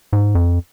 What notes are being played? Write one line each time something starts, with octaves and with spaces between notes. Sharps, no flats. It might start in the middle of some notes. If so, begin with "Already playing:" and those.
G#2
F2